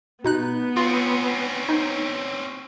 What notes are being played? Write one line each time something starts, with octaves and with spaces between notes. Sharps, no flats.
B2 B3 D#4 F#6
C4 C#4 F4
D#4